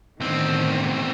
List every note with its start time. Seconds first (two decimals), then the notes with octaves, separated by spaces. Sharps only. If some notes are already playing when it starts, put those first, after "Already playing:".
0.21 E2 A2 D3 D#3 C4